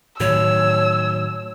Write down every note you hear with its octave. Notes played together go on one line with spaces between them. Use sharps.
A2 D#3 F#3 C#5 E6